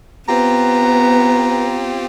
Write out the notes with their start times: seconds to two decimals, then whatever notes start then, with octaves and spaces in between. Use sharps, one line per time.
0.29 B3 C4 F4 G4 B4 A#5